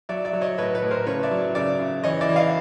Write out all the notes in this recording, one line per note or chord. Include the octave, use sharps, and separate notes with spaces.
F#3 D5 E5
D5 E5
F#3
C#5 D#5
A2 B4 C#5
B4 C#5
A2
A#4 C5
C#3 B4 C#5
D5 E5
F#3
C#3 D5 E5
C#3
E3 C#5 D#5
D5 E5
E3
D#5 F5